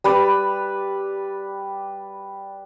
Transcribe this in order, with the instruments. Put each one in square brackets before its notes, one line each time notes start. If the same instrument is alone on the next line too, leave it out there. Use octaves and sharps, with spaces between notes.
[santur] G3 B4 D5